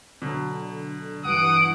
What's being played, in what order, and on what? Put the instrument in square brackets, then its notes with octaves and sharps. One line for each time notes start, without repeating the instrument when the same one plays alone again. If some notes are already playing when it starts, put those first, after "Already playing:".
[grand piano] B2 F#3 [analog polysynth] D3
[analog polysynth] G2 E3 [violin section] F#5 D7 [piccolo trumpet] D#6